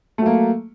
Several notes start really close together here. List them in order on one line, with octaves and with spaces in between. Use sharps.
A3 F#3 A#3